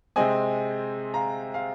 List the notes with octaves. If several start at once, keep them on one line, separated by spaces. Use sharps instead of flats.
C3 G#3 C4 D#5 G#5
F5 A#5
F5